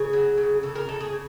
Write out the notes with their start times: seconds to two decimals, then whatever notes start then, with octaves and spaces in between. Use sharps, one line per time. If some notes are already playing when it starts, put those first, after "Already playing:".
Already playing: C#3 G#4
0.13 F#3
0.38 C#3
0.63 C#3 A4
0.76 A#4
0.88 C#3 A4
1.00 G#4
1.12 C#3